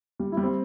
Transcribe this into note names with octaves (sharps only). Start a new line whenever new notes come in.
G3
G3 E4
C4